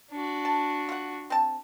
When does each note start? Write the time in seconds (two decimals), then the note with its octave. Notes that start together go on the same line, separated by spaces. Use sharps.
0.11 D4 F#4
0.45 A5
0.89 F4 F#5
1.30 C4 A5